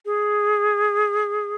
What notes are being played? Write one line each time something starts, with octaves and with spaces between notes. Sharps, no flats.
G#4